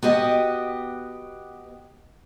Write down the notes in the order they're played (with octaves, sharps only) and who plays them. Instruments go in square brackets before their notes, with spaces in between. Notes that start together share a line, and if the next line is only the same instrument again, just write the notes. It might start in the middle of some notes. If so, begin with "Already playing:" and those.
[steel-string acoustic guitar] B3 F#4 G4 D#5